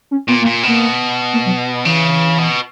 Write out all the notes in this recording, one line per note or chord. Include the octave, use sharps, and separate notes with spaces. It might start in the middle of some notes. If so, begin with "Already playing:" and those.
C#4
A#2 B3
A#3
A#2
B2 A#3
A#3
F#3
C#3 E3
B2